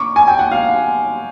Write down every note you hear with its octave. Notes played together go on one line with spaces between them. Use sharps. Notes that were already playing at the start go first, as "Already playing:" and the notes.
Already playing: C#6 D6
G#5
G5
F#5
F5